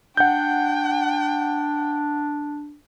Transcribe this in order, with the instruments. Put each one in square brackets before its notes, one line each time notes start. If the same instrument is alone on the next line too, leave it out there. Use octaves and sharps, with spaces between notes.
[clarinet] D4 [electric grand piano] F#5 G6 [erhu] G5